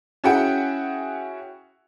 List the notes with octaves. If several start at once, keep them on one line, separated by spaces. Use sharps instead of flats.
C#4 E4 F#4 G#4 F#5 G5